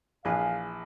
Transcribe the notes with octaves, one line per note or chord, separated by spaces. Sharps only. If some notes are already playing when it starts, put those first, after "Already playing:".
A#1 E3 G#4 B4 F5